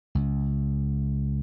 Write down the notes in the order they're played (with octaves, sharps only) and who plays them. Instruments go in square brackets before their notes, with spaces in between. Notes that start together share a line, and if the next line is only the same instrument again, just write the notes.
[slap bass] C#2